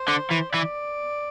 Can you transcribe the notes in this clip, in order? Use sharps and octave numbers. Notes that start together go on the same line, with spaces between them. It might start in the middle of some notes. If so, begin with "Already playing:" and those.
Already playing: C5
D3
E3
E3 D5